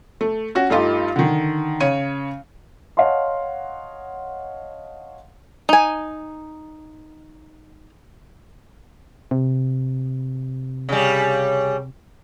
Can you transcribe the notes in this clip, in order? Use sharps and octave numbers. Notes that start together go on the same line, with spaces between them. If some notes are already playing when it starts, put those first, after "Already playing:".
A3
C#4 F#4
G2 A3 D#4 F4 G4
D3 D#3
C#3 C#5 D#7
C#5 D#5 F5 F#5 A5 C6
D#4 G#5
C3
C#3 G3